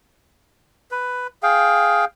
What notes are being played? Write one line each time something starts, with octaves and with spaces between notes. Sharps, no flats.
B4
G#4 F5 G5